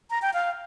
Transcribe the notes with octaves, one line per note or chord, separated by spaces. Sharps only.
A#5
G5
F5